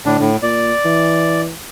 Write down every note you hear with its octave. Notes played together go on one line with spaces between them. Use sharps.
A2 D3 D4
A2
A#2 D5
E3